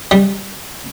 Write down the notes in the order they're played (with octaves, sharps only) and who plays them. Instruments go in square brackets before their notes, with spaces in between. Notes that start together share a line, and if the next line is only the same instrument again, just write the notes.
[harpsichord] G3